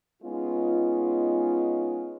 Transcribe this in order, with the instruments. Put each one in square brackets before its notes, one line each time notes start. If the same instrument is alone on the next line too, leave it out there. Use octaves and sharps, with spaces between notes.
[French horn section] G#3 B3 C#4 D#4 F4